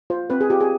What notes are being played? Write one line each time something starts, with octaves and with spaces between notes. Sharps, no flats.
F4 C5
C4 B4
G#4
F4 G4
G#4